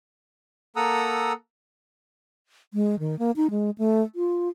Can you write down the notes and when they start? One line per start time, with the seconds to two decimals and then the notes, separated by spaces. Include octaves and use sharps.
0.76 A#3 A4 F#5 A#5 D#6 E6
2.74 G#3
2.99 D#3
3.19 A#3
3.36 D#4
3.50 G#3
3.78 A3
4.15 F4